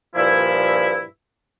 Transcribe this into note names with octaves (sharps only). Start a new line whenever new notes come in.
G2 A#2 F3 E4